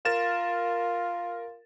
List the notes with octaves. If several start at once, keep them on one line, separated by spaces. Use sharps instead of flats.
F4 A#4 A6 E7